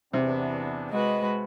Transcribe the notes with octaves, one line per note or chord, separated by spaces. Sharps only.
E2 C3 B3 D4
G#3 F#4 B4 D#5